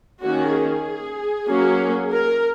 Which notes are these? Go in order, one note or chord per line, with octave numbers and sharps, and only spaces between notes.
D#3 A#3 C#4 F#4
G#4
F#3 A#3 C#4
A#4